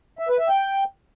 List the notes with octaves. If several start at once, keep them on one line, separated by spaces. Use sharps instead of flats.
E5
B4
E5
G5